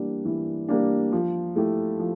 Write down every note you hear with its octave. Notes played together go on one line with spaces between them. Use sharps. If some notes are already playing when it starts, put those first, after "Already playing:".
Already playing: E3 G3 A#3 D4
E3
G3 A#3 D4
F3
A3 E4 G4
F3